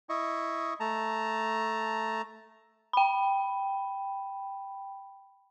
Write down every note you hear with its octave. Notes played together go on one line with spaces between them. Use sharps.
E4 D#5 C#6
A3 A5 A#5
G5 B5